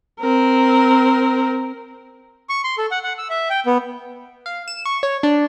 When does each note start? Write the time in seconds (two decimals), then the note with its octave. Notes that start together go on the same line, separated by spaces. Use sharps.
0.21 C4 A#4
2.50 C#6
2.64 C6
2.78 A4
2.91 F#5
3.03 F#5
3.18 E6
3.30 E5
3.50 G5
3.66 B3
4.46 F5
4.68 E7
4.85 C#6
5.03 C#5
5.23 D4